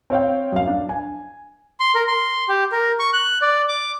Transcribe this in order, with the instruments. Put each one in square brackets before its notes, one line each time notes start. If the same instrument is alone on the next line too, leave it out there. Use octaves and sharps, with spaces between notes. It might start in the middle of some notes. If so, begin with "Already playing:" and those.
[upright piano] C4 C#5 F5 G5
F#2 F5
D4
G#5
[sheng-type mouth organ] C6
A#4
C6
G4
A#4
C#6
F#6
D5
D6